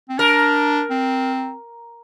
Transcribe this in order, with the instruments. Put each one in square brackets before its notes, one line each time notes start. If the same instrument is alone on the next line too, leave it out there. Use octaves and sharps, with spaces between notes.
[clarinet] C4
[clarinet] D4 [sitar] A#4
[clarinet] C4